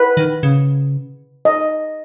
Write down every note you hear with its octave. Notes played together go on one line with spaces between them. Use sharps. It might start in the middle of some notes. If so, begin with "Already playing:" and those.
Already playing: B4
D#3
C#3
D#5